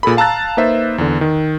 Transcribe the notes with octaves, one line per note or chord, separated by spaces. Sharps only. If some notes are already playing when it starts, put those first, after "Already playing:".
A#2 G#4 A4 B5
F5 A5 A#5 E6 F#6 A6
A#3 D#4 B4 C5 E5
E2 D3
D#3